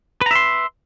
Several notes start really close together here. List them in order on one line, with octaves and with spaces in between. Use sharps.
B4 A#5 E5 C6